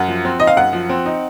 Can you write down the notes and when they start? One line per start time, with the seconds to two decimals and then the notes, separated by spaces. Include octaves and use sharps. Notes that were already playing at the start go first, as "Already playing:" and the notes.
Already playing: F#2 F#5
0.08 F3
0.25 C4
0.40 D#4 D#5
0.47 F5
0.57 F#2 F#5
0.73 F3
0.89 C4
1.06 D#4